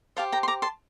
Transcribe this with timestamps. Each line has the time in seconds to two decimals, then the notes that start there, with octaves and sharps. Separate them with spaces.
0.17 G4 C5 F5 A5
0.32 G5 A#5
0.43 C6
0.48 A#5 D6
0.62 A5 C6